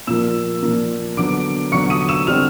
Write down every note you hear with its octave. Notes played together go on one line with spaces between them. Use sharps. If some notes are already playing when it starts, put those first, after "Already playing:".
A#2 F3 A#3 E6 E7
A#2 F3 A#3
D3 F#3 B3 D6 D7
D3 F#3 B3 C#6 C#7
D#6 D#7
E6 E7
D3 G3 C4 F6 F7